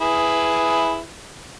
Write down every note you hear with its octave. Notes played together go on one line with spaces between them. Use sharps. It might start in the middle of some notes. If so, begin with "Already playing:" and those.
E4 G#4 B4